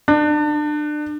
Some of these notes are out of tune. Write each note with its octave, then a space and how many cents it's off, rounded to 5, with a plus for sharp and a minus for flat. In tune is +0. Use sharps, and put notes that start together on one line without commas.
D4 +30